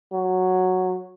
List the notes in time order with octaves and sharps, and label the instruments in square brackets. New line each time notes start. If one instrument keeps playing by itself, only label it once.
[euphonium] F#3